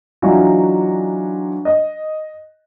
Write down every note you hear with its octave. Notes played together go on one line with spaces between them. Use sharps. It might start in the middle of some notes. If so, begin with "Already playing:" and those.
E3 F#3 D4 D#4 F4 F#4
D#5